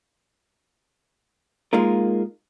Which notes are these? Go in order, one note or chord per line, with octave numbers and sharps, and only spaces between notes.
G#3 A#3 D#4 F4 A#4